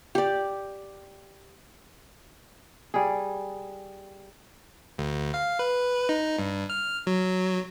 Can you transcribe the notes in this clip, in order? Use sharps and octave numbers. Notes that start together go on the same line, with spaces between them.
G4 D5
G3 G#4
D2
F5
B4
D#4
G2
F6
F#3